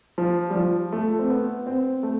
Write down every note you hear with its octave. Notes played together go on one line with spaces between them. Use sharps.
F3
G3
F3
A3
C4
B3
C4
A3